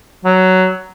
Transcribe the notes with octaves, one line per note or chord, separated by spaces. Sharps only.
F#3